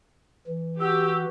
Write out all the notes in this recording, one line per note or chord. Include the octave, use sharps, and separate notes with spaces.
E3
F#4 G4 E6